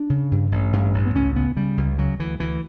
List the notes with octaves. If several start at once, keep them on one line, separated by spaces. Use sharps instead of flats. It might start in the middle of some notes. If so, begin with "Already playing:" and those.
Already playing: D4
C#3
G2
A1
G2
A1
B3
C#2 C#4
C#3 B3
C#3 G3
C#2
C#3 F#3
D2 E3
D2 E3